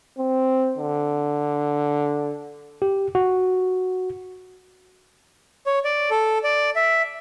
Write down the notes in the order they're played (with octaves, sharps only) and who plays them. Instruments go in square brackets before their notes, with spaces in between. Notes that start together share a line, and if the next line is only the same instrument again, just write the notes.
[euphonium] C4
D3
[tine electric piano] G4
F#4
[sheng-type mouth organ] C#5
D5
A4
D5
E5